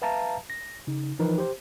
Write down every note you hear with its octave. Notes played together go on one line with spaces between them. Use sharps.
B4 E5 F5 A5 A#5
A#6
C#3 D#4
E3 F3 D#4 A#4 B4
G4 C5